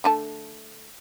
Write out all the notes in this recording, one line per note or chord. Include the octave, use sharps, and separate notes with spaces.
D3 A3 A5